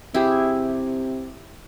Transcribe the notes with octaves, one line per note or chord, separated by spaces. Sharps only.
C3 E4 G4 G#4